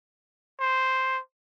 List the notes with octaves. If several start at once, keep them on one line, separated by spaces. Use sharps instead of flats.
C5